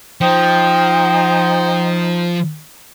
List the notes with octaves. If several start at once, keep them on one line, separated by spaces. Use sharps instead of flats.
F3 D#4 C5 G5